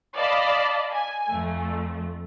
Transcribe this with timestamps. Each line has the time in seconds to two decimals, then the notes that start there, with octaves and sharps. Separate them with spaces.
0.16 D5 D#5 F5 A5 B5
0.92 G#5
1.29 F2 A3